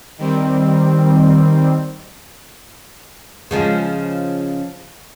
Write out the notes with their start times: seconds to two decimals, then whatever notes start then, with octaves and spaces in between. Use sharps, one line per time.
0.18 D#3 G3 C4
3.51 C#3 F3 G#3